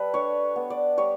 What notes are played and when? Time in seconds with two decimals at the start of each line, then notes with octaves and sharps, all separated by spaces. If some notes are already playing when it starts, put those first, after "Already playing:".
Already playing: G3 A4 B4
0.14 D4 C#5
0.56 B3
0.70 D5
0.97 G3 C#5